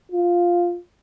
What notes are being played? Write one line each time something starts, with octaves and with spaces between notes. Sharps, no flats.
F4